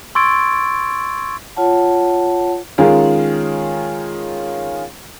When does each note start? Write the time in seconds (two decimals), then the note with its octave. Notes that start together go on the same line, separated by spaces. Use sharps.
0.15 C6 C#6 E6 G#6 A6 D7
1.56 F4 C#5 F#5 A5
2.78 D#3 G#3 C#4 F4 G#4 A#4